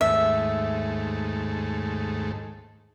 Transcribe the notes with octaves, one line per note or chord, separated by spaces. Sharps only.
D#2 G#2 A3 E5